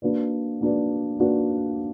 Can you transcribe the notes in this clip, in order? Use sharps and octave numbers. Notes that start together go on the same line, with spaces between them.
A#3 D4 F#4 B4 D5
A#3 D4 F#4 B4 D5
A#3 D4 F#4 B4 D5